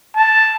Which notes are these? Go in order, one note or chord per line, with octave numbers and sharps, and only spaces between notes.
A5